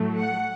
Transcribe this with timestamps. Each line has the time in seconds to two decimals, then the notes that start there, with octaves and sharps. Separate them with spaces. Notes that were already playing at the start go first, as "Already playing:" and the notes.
Already playing: A2 F#3 A3
0.16 F#5